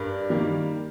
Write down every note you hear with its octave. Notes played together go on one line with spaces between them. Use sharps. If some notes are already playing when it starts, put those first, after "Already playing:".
Already playing: G2 A#4 D5
D#3 G3 A#3